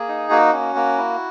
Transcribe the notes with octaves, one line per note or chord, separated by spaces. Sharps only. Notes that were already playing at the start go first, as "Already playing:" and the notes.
Already playing: A#3 G#4
D#4
A#3 F#4
C#4
A#3
E4